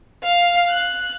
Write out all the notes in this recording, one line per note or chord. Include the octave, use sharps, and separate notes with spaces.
F5
F#6